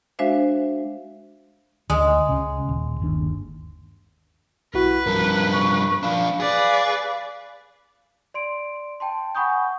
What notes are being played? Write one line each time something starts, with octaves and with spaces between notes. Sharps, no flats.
G#3 D4 F#4 C5 E5 F5
D2 G#3
C#2 C#3
D#1
G1 D#2 D4
B1 E4 F#4 B4
G2 F3 A#4
C#6
F3 D4 F5 B5
G#4 B4 D5
D5 C6 D7
G5 A5 C6
F#5 G#5 B5 C#6 D#6 G6